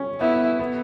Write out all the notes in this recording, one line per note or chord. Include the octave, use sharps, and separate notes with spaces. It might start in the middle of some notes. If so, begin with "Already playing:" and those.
Already playing: C#4
B3 E4
B3